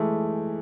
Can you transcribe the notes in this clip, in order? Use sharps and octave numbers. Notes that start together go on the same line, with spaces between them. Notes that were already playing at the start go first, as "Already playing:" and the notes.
Already playing: E3 G#3 A3